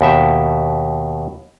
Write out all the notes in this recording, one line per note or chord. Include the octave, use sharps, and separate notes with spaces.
D#2 B2 E5 G5